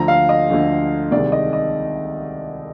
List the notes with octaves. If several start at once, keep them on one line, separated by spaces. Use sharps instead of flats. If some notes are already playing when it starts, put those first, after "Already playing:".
Already playing: D2 D3 F3 A#5
F5
D#5
D2 D3 F3
C2 C3 D#3 G#3 D5
D#5
D#5